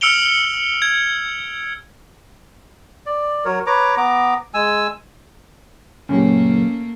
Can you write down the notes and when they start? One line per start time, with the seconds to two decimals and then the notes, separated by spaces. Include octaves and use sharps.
0.01 E6 F6 C#7 D7 F7 G7
0.82 G#6
3.06 D5
3.45 F#3 A#4 C#5
3.66 B4 C#5 A#5 D6
3.97 B3 A#5 D6
4.54 G#3 G#5 E6
6.09 C#2 F#2 A#2 A3 A#3 C#4 G4